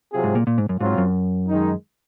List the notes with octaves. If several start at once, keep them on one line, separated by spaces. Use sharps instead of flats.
C3 F#3 C4 F4 G#4
G#2
A#2
A#2
G#2
F#2
G#2 F#3 C4 F4
F#2
D#3 G#3 D#4